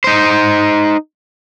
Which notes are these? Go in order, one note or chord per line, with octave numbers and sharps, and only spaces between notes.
D#4 C5